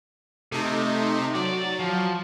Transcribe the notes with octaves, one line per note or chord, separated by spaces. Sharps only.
C3 A3 D#4
F#3 D5
F3